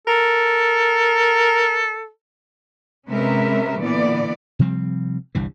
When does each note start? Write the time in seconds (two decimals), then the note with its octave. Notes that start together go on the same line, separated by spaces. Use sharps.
0.07 A4 A#4
3.08 C3 G#3 C#4 A#4 B4 E5
3.80 A#2 D3 E3 B3 D5
4.59 C3 F3 G3 C4
5.35 G1 C2 G2 E3